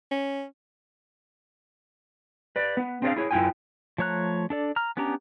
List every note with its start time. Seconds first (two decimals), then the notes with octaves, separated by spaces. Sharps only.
0.11 C#4
2.56 B4 D5
2.77 B3
3.02 C4 D4 G#4 C5 D5 F5
3.16 E4 G#4 C#5
3.31 F#2 E4 F4 G5 G#5
3.98 F3 A3 C#5 A#5 F#6
4.50 D4 A4 D5
4.76 A#5 F6
4.97 B3 C#4 D4 G4 A#5